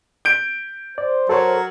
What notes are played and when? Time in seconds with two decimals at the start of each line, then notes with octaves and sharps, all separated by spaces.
0.25 G6 D7
0.98 C5 D5
1.29 F#3 A4 A#4 C5 C#5